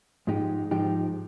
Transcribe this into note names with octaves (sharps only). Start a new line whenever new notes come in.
G#2 F3 G#3 D#4 G4
G#2 F3 G#3 D#4 G4